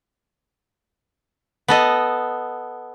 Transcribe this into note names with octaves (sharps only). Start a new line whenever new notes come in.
B3 A4 D#5